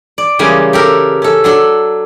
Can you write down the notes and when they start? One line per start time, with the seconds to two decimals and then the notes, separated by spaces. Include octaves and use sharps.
0.18 D5
0.39 C#3 E3 G3 G#3 A#3 C#4
0.73 G4 A4 A#4
1.22 C#4 A4
1.44 F#3 D4 A4